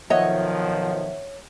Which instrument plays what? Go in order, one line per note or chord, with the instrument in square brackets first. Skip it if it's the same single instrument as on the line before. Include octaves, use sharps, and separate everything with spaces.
[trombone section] B1 D#3 F3 [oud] C#5 D#5 [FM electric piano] E5 F#5